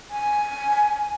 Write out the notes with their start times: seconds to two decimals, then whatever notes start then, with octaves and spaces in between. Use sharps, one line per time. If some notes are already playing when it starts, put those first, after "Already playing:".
0.11 G#5